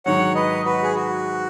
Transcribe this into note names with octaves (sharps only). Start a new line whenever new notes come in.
G#2 D#3 F#3 C#5 F#5
B4 D#5
F#4 B4
G#4
F#4